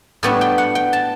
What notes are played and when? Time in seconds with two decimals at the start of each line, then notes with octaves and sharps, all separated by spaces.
0.23 A2 G3 B3 D4
0.41 G5
0.58 F#5
0.75 G5
0.93 A5